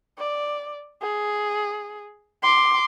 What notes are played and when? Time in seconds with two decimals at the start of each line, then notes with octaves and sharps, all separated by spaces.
0.18 D5
1.02 G#4
2.43 C6 D6